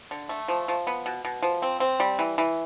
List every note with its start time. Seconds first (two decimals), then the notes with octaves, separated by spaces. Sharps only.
0.11 D3
0.29 A3
0.48 F3
0.68 F3
0.87 B3
1.06 B2
1.25 B2
1.43 F3
1.62 C4
1.80 C4
2.00 G3
2.19 E3
2.38 E3